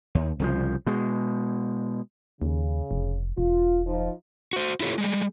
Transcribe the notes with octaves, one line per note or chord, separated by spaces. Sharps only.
D#2
C2 C#3 F3
B2 G#3
D#2 C#3
F1
E1 F4
F3 D#4
F#4 C5
E4 F4 G4 A4 C#5
G3 G#3